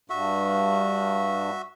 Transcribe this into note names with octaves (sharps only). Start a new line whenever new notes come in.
G2 F#4 E5